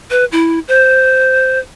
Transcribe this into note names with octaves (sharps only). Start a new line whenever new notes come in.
B4
E4
C5